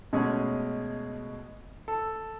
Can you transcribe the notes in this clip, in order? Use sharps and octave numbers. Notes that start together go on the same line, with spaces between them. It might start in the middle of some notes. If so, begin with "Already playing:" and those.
B2 G#3 A3 C#4 G#4
A4